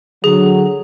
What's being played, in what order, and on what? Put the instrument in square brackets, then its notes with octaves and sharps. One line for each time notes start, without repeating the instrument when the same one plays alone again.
[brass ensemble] D3 F#3 [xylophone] G#4